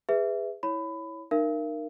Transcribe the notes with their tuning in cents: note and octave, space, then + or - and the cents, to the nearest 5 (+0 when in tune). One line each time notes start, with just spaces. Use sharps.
G#4 -20 B4 +10 E5 +0
E4 -10 C#5 +0 B5 +20
D#4 -35 A#4 +0 F5 -45